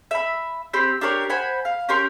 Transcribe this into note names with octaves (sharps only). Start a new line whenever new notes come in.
E5 B5
C4 G4 B5 C6
D4 G4 A#4 C#5
C5 F#5 G#5 B5
F5
C#4 G4 A#4 C6